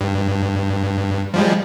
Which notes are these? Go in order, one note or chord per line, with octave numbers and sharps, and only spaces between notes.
G2
F3 G3 G#3